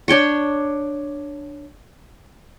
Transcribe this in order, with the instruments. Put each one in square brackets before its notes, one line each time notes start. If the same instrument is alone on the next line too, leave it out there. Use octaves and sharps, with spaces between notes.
[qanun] D4 C#5 G5 C#6